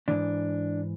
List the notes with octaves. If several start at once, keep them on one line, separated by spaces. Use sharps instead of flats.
G#2 E3 D4